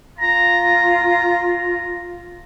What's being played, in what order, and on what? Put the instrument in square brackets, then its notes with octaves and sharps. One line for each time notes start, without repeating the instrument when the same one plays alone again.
[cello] F4 [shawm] A#5